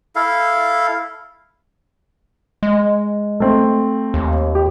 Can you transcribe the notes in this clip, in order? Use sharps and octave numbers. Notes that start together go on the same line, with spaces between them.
E4 A4 F5
G#3
A3 C4
D#2
G4